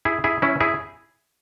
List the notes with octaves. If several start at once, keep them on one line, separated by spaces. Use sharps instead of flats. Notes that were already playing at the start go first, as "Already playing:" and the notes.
E4 G#4
E4 G#4
C#4 E4
E4 G#4